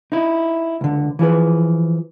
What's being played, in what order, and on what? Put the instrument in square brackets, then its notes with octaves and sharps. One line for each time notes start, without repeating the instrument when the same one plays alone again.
[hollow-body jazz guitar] D#4 E4
C#2 D3
E3 F3 G#4 B4